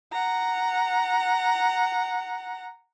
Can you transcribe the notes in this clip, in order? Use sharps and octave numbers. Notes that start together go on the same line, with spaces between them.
F#5 A#5